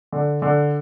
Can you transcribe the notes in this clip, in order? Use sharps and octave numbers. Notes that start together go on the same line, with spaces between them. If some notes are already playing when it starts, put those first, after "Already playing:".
D3
D3